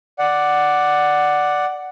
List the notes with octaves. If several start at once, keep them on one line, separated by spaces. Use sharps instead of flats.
D5 F#5